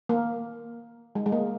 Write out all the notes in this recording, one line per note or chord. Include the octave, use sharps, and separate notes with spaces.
A#3
G#3
G#3
A#3